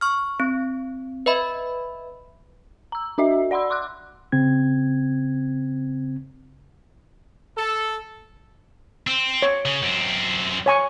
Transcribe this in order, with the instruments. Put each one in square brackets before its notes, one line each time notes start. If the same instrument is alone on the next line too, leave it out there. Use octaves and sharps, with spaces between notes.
[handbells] C#6 F6
C4
B4 D#5 E5 B5
[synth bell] A#5 E6
D4 F#4 D#5 E5
D5 F#5 B5 C6 E6
C6 D6 E6 F#6
[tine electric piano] C#3 C4 G#6
[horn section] A4
[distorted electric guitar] C4
[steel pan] C#5
[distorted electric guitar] C#3
F#2 C4
[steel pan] C#5 G#5 C#6